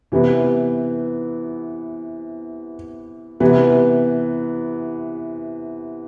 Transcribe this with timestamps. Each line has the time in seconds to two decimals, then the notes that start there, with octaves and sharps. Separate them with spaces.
0.12 C3 E3 B3
3.40 C3 E3 B3